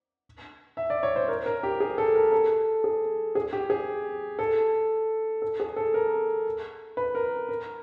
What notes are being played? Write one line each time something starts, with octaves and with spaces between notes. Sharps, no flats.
E5
D5
C#5
C5
A#4
A#4
G4
G#4
A4
A#4
A4
G#4
G#4
G4
G#4
A4
A4
G#4
A4
A#4
B4
A#4
A#4